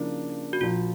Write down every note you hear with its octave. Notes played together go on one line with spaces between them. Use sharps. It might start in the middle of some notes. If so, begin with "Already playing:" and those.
Already playing: C#3 F3 A#3 D4 E4
F#4
A#1 A#2 F3 F4